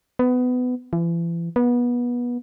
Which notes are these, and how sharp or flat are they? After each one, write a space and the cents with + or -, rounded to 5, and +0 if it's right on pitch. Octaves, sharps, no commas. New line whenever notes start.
B3 +20
E3 +40
B3 -25